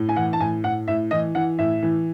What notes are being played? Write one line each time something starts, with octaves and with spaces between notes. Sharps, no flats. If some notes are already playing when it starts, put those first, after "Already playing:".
Already playing: A2
G#5
E3 F#5
A5
A2 G#5
A2 F#5
A2 E5
E3 D#5
E3 F#5
A2 E5
E3